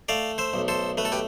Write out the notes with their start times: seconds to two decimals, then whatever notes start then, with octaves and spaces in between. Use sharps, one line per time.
0.09 A3 D5 F5
0.38 C5 E5
0.54 B1
0.68 A4 C5
0.98 A3 B4
1.05 A4
1.12 G4 B4